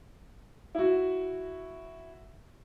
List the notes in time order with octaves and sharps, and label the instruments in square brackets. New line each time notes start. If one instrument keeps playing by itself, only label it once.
[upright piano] E4 F#4